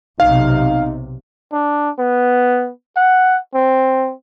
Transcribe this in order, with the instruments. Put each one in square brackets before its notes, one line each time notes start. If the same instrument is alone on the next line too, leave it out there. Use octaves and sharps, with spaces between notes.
[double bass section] B1 C3 [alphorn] D#4 [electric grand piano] F5
[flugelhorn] D4
B3
F#5
C4